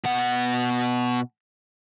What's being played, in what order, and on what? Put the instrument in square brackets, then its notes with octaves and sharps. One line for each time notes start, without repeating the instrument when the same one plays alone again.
[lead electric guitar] B2 F#5